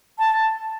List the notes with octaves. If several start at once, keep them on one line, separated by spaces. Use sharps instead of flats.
A5